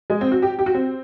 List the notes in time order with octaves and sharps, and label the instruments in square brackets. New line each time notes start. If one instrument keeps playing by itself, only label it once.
[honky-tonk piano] G#3
C4
F#4
G4
G4
F#4
C4